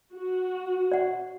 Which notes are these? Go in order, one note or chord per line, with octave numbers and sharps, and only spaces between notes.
F#4
D5 F#5